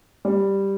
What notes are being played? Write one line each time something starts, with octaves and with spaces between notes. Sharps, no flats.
G3